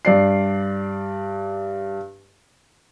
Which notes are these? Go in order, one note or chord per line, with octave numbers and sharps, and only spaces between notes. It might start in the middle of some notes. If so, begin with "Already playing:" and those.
G2 D5 C7